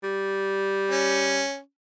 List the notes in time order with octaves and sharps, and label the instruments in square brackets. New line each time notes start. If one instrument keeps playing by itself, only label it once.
[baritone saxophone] G3
[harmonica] C#4